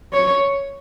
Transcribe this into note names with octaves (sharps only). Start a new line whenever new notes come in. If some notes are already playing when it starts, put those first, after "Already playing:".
C#5